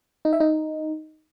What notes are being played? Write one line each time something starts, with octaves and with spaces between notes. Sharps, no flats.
D#4
E5
D#4